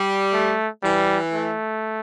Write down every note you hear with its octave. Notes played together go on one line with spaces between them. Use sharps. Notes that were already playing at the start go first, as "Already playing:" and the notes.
Already playing: G3
A3
E3 G3
A3